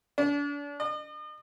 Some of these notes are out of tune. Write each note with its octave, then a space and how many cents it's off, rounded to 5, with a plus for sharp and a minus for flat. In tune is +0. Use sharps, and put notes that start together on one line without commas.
D4 -35
D#5 -45